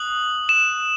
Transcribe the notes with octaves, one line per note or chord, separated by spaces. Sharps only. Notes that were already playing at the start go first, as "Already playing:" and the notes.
Already playing: D#6 F#6 F#7
E7